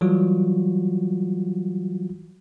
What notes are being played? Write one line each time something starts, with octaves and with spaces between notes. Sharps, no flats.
E3 F#3 G3 F4 F#4